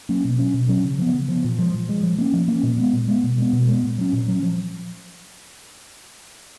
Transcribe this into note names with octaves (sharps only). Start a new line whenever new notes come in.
F#3 A#3 C#4
B2
F#3 C#4
B2
F#3 C#4
C#3
F3 B3
C#3
F3 B3
A#2
F3 G#3
A#2
F3 G#3
F3
A#3 C#4
F3
A#3 C#4
A#2
G#3 B3
A#2
G#3 B3
B2
G#3 B3
B2
G#3 B3
A#2
F#3 C#4
A#2
F#3 C#4
F3